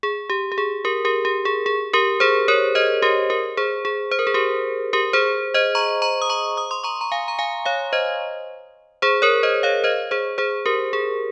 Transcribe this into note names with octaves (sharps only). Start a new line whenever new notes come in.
G#4
G4
G4
G#4
G4 A#4
G4 A#4
G4
G#4
G#4
G4 A#4
G#4 C5
A#4 C#5
C5 D#5
G4 A#4
G4 A#4
G#4 C5
G#4
C5
A#4
G#4
G4 A#4
G4 A#4
G#4 C5
C5 D#5
A#5 C#6
A#5 C#6
D#6
A#5 C#6
D#6
C6 D#6
A#5 C#6
A#5
F5 G#5
A#5
F5 G#5
C#5 F5
C5 D#5
G#4 C5
A#4 C#5
C5 D#5
C#5 F5
C5 D#5
G#4 C5
G#4 C5
G4 A#4
G#4